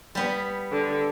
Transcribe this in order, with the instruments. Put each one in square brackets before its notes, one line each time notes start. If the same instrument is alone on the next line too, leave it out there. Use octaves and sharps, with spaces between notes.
[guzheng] G3 B3
[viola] D3